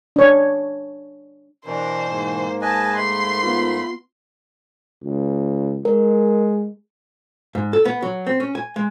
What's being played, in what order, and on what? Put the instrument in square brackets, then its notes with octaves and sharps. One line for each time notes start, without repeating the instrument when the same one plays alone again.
[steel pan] D4 C#5
[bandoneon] B2 E3 [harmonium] D4 A#4 [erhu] C5
[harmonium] G#2 A#3
[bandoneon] B4 D#5 G#5 [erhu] A5
[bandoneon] A3 B5 [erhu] C6
[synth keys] B3 F4
[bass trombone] C#2
[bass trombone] G#3 [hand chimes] A#4
[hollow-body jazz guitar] G#2
A4
B3
F#3
C4
C#4
G#5
G#3